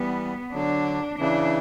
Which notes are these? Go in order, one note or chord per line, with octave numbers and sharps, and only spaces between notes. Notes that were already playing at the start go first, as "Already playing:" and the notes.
Already playing: E3 G3 B3
D3 F#3 D4
C#3 E3 D4